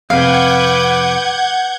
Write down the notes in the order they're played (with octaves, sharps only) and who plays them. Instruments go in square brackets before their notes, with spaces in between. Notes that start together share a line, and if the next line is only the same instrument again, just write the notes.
[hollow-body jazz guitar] F2 C3 [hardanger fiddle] B4 D6 [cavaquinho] F5 [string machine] F#5 G6 G#6